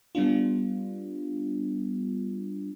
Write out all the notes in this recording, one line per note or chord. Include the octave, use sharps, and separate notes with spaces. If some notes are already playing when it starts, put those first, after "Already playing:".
G3 B3 D4 F4